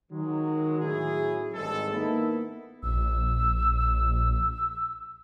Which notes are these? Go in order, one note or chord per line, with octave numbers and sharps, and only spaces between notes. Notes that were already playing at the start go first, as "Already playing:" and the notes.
D#3 F#3 G#3
A2 F#3 C#4 E4 G#4
G#1 G2 G#3 A4
A#3 B3 D#4 E4
A#1 E6